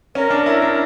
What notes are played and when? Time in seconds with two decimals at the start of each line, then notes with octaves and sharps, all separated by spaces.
0.15 C#4 A#4
0.30 D4
0.46 E4 A#4
0.62 D4